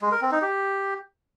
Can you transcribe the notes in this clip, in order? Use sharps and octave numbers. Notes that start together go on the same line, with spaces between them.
G#3
A#4
C4
D#4
G4